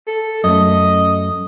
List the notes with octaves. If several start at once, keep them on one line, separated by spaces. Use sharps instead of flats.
A4
F#2 A3 D#5